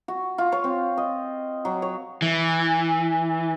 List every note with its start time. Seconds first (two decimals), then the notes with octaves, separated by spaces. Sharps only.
0.08 F#4
0.38 F4
0.52 C#5
0.64 C4
0.97 D#5
1.65 F#3
1.82 C#5
2.22 E3